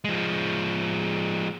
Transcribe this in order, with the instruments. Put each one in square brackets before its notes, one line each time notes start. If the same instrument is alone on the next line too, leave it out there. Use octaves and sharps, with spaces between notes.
[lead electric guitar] F3 G#3